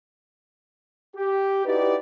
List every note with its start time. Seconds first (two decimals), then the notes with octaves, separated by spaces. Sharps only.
1.15 G4
1.65 D#4 E4 F#4 G4 B4 D5